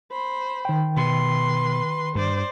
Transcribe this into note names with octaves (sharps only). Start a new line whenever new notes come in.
C5 B5
D#3 G5
B2 B4 C6
G2 C5 D5